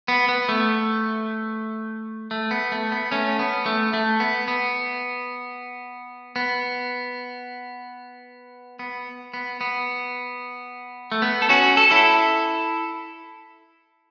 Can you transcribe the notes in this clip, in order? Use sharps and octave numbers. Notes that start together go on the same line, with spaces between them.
B3
B3
A3
A3
B3
A3
B3
A3 C#4
B3
A3
A3
B3
B3
B3
B3
B3
B3
A3
B3
A4
C#4 F#4
A4
E4 A4